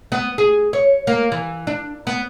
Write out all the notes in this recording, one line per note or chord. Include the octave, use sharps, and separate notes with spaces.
B3
G#4
C#5
A#3
E3
D4
B3